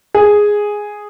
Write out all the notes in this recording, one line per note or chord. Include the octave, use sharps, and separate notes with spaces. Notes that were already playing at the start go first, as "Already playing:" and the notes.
G#4